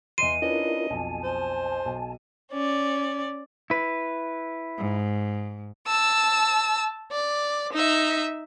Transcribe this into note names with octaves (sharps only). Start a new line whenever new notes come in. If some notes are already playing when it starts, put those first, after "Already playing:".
E2 D#5 C6 C7 D#7
C#4 D4 E4 F4 A#4 B4 D#5
B1 F2 G#5 A5
C5
B1
C#4 D5
E4 B4
G#2
A5 E6
D5
D#4 E5